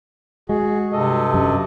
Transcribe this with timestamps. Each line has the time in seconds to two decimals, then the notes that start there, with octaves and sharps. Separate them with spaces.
0.49 G#3 F#4 G#4
0.93 G2 C3 A4 D#5
1.34 F#2